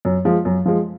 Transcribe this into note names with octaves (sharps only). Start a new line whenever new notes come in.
F#2
F3 G#3
F#2
F3 G#3